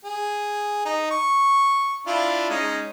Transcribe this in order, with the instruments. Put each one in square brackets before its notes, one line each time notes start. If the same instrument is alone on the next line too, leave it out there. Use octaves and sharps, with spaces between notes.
[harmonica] G#4
D#4
C#6
D4 E4 F4
G#3 C#4 D#4